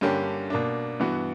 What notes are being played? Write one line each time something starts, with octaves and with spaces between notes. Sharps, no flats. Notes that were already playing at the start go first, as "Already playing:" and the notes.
G2 D3 A#3 C#4 G4
B2 A#3 D4
G2 E3 B3 F#4